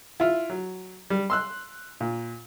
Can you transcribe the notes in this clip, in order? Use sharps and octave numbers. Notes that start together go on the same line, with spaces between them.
E4 F4
F#3
G3
C6 E6 F#6
A#2